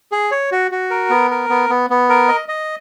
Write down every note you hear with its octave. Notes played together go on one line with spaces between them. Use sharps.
G#4
C#5
F#4
F#4
A#4
B3
A#4
B3
B3
B3
A#4
D#5
D#5